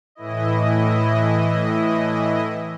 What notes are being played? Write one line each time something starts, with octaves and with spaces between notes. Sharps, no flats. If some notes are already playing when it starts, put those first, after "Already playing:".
A2 E3 E4 D#5